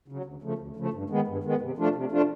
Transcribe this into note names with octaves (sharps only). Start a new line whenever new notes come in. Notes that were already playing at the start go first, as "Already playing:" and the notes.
C#3 F#3
D2
C#3 F3 A3
D2
C#3 F3 A3
G2
D#3 G#3 B3
G2
D#3 G#3 B3
C3
F3 A3 D4 F4
C3
F3 A3 D4 F4